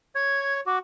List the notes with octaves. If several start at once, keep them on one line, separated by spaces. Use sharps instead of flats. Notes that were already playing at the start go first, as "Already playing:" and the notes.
C#5 G#6
F#4 D6